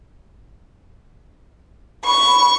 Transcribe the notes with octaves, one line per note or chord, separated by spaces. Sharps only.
B5 C#6